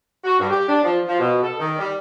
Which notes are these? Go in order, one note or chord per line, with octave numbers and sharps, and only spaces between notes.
F#4
G2
G4
D4
F3
F3
B2
A4
D#3
G3